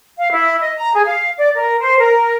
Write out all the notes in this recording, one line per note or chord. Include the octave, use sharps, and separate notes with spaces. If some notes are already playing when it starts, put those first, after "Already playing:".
F5
E4
D#5
A#5
G#4
F5
D5
A#4
C5
A#4